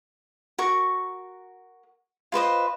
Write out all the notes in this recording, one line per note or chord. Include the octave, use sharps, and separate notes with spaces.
F#4 A#4 C#6
F4 B4 C5 D#5